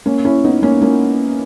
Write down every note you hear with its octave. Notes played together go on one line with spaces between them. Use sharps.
A#3 C#4
C#4 E4
B3 D#4
A#3 C#4
A#3 C#4